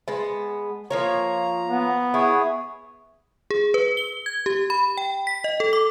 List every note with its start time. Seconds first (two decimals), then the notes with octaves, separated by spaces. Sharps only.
0.08 G#3 B3 A5
0.90 F3 A#3 C#5 A#5
1.69 B3
2.14 E4 G#4 C#5
3.51 G#4
3.74 B4
3.97 G7
4.26 G#6
4.46 G4
4.70 B5
4.97 G5
5.27 B6
5.44 D#5
5.60 A4
5.73 D6